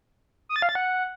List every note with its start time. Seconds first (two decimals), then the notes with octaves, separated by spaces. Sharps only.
0.49 D#6
0.56 A6
0.62 F5
0.69 A6
0.75 F#5